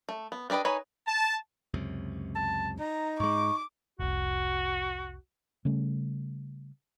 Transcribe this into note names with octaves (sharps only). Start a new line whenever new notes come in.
A3
B3
C#4 D4 G4 B4 D#5
D#4 B4 C#5 G#5
A5
C#2 F#2 C3
A5
D#4 A#5
G#2 G#3 C#6 D6
F1 C2 F#4
C#3 G3 A3 C#4